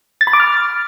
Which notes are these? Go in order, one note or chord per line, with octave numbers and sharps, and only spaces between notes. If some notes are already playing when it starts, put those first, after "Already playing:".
A6
B5
D6
F6